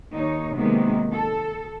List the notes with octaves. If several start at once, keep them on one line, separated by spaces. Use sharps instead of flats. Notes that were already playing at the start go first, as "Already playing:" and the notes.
D#2 D#4 C#5
C3 D#3 F#3 G#3 A#3 B3
A4